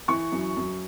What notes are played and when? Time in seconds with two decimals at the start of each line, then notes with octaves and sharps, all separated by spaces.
0.08 E3 C#6
0.32 F#2
0.57 F#2